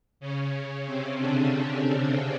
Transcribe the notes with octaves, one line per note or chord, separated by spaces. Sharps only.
C#3 C#4
C3 C4
D3 D4